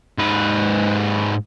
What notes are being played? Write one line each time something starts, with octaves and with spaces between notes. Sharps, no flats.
G#2 B4